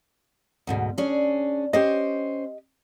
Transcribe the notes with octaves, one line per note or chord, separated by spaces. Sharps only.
D2 G#2 B2
C#4 D4 G#4
C#4 G4 C5 D#5